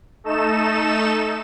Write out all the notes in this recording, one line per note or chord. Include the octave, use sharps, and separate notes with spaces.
A3 D#4 A4 E7